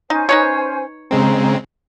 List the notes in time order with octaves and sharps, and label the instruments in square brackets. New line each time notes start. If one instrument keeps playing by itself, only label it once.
[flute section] C#4 C5 G#5 [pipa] D#4
[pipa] D#4 B4 C#5
[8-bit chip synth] C#3 G#3 C4 [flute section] A#5